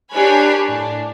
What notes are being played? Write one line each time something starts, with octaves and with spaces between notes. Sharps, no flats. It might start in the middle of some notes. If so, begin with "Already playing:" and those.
D4 G4 A#4 C#5 G#5 B5
A2 D4